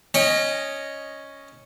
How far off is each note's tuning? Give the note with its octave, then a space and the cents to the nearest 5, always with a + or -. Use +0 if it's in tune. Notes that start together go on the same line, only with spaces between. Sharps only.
C#4 +0 D#5 +0 G5 +40